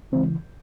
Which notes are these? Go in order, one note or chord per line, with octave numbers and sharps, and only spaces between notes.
C#3 E3 G#3 C4